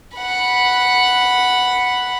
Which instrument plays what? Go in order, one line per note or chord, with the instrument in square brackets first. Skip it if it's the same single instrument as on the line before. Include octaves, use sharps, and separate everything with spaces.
[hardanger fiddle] F#5 B5